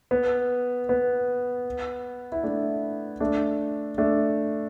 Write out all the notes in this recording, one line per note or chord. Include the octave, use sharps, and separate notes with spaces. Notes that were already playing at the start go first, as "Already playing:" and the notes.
B3
B3
E4
A3 D4
A3 D4
A3 D4